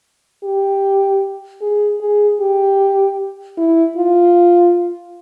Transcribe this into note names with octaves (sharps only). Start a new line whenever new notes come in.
G4
G#4
G#4
G4
E4
F4